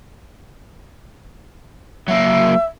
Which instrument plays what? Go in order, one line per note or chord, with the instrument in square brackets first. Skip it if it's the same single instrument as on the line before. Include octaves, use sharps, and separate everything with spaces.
[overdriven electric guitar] F#3 A#3 [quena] E5